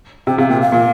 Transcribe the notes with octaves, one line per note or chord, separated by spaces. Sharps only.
C3 G5
C3 F5
A#2 G5
F5
A#2